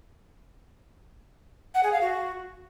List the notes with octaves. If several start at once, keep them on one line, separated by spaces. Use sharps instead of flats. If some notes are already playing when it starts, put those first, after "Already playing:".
F#5
G#4
F5
F#4